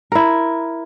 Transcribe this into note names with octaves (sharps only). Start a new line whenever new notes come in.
E4 A#4